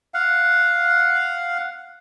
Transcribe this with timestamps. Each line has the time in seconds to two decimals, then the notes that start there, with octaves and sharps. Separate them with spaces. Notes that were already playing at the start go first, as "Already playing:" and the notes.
0.14 F5 F#5